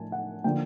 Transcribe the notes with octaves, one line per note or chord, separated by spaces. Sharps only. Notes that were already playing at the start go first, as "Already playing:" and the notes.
Already playing: A2 F3 G#5 A5
F#5
D3 F3 A#3 G5